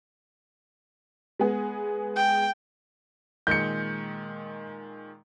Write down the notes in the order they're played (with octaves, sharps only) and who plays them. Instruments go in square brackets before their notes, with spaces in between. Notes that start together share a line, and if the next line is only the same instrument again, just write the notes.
[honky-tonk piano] G#3 B3 G#4
[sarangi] G5
[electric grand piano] A#2 D#3 G#3 [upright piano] G6 C#7